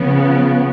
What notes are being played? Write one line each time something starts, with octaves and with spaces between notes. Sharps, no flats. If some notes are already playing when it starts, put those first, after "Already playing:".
Already playing: C#3 F3 B3